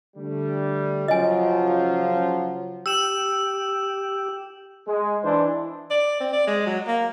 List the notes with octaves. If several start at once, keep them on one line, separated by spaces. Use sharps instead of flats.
D3 G3 A3
C#3 F3 F#3 F4 D#5 G#5
G4 E6 E7
G#3
E3 D4 E4 C5
D5
C4
D5
G#3
F#3
A#3